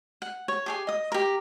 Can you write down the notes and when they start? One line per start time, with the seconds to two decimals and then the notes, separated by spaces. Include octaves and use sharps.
0.22 F#5
0.48 C#5
0.66 G4 G#4 G#5
0.87 D#5 D#6
1.12 G4 A#4